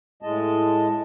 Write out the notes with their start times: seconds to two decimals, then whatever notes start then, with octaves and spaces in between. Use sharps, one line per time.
0.22 A2 G#3 D#5 A5